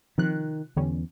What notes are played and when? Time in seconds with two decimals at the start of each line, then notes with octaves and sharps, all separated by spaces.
0.18 C3 D#3 F3 F#6
0.76 E2 D3 G3 C#4